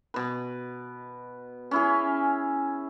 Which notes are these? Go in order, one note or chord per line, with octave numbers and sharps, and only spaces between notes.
B2 B4
C#4 E4 G#4